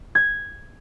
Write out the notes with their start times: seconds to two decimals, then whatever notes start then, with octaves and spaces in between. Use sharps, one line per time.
0.15 G#6